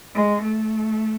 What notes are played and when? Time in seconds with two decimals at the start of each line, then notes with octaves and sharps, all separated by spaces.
0.15 G#3
0.43 A3